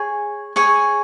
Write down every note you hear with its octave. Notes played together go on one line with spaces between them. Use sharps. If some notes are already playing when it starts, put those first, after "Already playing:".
Already playing: G#4 C#5 G#5
G#4 C#5 G#5